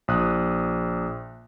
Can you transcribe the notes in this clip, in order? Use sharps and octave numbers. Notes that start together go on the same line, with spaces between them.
A#1 D#6 F#6